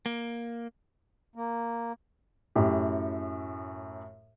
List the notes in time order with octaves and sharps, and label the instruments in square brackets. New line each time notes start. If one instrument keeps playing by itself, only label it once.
[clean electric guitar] A#3
[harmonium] A#3
[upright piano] F#2 A2 G4